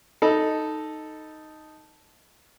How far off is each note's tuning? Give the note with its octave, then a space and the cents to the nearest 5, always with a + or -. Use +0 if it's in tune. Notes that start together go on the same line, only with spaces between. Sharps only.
D#4 +0 A4 +0 B5 -20